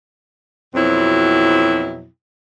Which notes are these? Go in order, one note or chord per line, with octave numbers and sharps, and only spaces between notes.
F2 B2 F#3 C4 E4